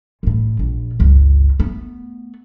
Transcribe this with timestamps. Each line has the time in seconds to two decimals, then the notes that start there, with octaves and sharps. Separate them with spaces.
0.23 A1 A2
0.59 A#1
0.99 G1 C#2
1.60 A3 B3